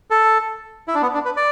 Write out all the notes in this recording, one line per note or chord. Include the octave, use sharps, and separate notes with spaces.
A4
E4
D4
B3
D4
B4
D5